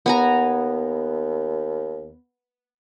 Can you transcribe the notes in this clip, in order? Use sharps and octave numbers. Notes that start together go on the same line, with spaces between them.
D#2 B3 G#5 A#5